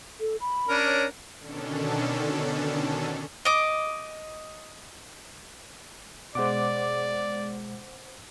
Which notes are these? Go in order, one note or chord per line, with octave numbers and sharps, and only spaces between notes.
A4
B5
C#4 D4 A#4
C#5
B2 D3 D#3 C#4 D4 A4
D#5 D6
B2 G#3 C5 D5 F#5 D6